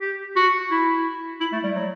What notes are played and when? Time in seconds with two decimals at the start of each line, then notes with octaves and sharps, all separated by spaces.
0.01 G4
0.36 F#4
0.71 E4
1.41 E4
1.52 A3
1.64 G3
1.75 F#3